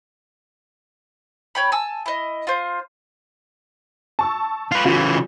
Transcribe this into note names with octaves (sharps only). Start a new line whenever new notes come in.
C#5 G5 B5
G#5 A5 E6
E4 D#5
F4 C5
A5 C#6 E6
F4 B4
C#3 E3 F4 F#4